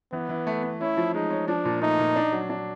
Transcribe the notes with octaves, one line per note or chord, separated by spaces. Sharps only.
E3 B3
E3
A3
A3
C#4 E4
F3
G#3 D#4
C#4
F3 D4
A#2
A3 D#4
A#2
D4
F#3
D4